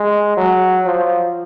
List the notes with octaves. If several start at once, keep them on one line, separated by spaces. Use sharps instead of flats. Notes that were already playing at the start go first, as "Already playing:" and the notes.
Already playing: G#3
F#3
F3